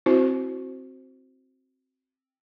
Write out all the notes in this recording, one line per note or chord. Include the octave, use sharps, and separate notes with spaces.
C4 E4 F#4 C5